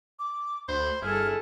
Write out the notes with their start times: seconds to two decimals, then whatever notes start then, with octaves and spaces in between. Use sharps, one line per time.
0.19 D6
0.68 D2 C5 B5
1.02 G1 E4 G#4 A4 F6